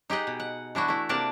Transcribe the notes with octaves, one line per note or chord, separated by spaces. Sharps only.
D#4 G4 G#4 D#5 F#5
B2
F#5
E3 D4 E4 F#4
A3 E4
C3 A#3 D4 A#4 D5 A5